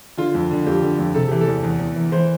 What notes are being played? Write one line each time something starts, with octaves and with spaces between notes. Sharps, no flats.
D3 F4
F2
D3
F2 G4
D3
F2
C3 A4
E3 G4
A4
E2
E2
E2
E3
E3 C5